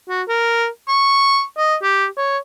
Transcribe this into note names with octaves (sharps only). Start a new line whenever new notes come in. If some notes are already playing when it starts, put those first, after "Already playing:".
F#4
A#4
C#6
D#5
G4
C#5